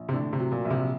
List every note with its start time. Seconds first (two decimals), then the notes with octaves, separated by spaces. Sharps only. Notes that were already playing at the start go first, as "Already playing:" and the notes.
Already playing: A#1
0.09 C3
0.13 A2 D3
0.33 C3
0.39 F#3
0.52 A#2
0.65 A#1
0.70 C3